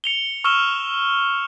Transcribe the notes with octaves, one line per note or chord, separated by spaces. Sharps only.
C#7 F7 G7
C#6 E6 F6 D#7 E7 G7